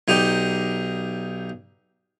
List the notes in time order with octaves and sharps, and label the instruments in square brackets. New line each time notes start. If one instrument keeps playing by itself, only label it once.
[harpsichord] B1 D#4 G4 D5